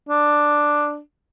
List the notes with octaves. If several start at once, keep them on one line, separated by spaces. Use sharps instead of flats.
D4